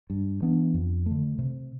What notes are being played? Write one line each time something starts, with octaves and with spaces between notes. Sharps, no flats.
G2
E3 B3 D4
F2
A3
D3
C3